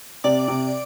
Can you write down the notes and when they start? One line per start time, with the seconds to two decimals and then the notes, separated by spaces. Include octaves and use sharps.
0.24 C3 D5 D6
0.48 C3